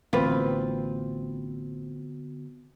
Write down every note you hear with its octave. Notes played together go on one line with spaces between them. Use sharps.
A1 D3 B3 C4 F4 F#4 B4